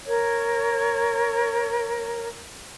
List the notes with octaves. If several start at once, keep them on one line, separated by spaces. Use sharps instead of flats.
A#4 C#5